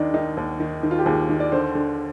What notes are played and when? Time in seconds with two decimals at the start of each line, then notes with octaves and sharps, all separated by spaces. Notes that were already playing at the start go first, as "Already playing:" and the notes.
Already playing: D#2 D#3 D4 D#4
0.14 D#3 D#4
0.37 D#2
0.60 D#3
0.83 D#3
0.91 F4
0.99 G4
1.06 D#2 G#4
1.29 D#3
1.40 D5
1.52 D3 C5
1.75 D3